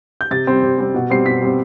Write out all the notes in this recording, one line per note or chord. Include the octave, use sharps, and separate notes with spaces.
G6
C3 A6
G3 C4
C3
G3 C4
B2
G3 C4 C7
B2 B6
G3 C4